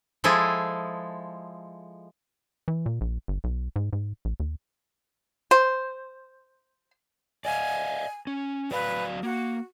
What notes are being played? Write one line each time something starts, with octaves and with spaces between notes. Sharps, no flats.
F3 G#3 E4 G#4 A4
E3
A#2
A#1
G1
B1
G#2
G#2
A#1
D#2
C5
D5 D#5 F5 G#5
C#4
F#3 B4 D5 F5
A#3 F#4